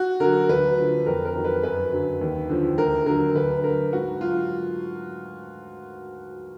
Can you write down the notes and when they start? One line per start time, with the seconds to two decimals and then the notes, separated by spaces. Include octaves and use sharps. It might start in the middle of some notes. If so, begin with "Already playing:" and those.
Already playing: F#4
0.20 D3 F#3 A#4
0.49 D2 B4
0.78 D3 F3
1.06 F2 A#4
1.25 A#4
1.35 D#3 F#3
1.44 B4
1.63 F#2 B4
1.92 D3 F#3
2.21 D#2
2.49 D3 F3
2.78 D2 A#4
3.06 D3 F#3 A#4
3.35 D2 B4
3.64 D3 F#3 A#4
3.92 G#2 F#4
4.21 F#3 F4